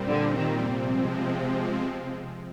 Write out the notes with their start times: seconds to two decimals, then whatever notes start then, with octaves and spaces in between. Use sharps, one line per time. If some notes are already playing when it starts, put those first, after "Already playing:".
Already playing: A#2 G3 C4
0.09 D3
0.39 D#3
0.67 C3 F3 G#3 C4